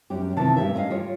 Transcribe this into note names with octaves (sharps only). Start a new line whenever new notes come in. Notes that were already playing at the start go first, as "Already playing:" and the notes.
F#2 G3 G4
C3 D#3 E3 A5
G2 G4 E5
C#4 E4 A#4 D#5 F5
G3 F4 C#5